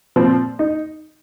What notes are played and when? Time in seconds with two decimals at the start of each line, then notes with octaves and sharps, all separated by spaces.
0.16 A#2 F3 C4
0.59 D#4